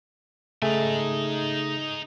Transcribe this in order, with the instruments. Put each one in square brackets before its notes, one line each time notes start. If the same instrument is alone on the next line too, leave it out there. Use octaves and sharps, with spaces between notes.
[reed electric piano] C#3 G#4 [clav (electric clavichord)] A3 [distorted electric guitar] D#4 G#5